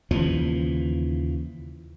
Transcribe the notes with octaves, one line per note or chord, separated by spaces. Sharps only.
D#2 C#3 E3 F3